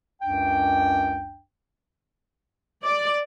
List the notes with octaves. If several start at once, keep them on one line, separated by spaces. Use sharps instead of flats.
C#2 F#2 D4 G5
D5